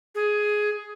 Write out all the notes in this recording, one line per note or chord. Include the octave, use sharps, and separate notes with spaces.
G#4